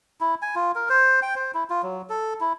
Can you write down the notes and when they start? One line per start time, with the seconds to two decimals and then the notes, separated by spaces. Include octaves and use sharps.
0.21 E4
0.42 G#5
0.55 F4
0.75 A#4
0.89 C5
1.22 G5
1.36 C5
1.54 E4
1.70 F4
1.83 F#3
2.10 A4
2.40 E4